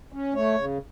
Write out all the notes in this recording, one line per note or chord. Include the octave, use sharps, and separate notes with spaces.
C#4
A3 C#5
C#3